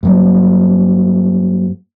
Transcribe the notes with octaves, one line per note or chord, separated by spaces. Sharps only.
G2 F#3 A#3